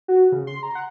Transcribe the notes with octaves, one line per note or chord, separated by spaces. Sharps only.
F#4
C#3
C6
A#5
F#5